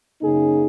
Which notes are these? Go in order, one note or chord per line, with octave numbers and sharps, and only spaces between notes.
F#2 C#3 A#3 D#4 G#4